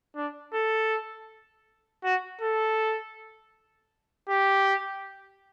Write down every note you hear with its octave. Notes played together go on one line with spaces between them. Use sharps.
D4
A4
F#4
A4
G4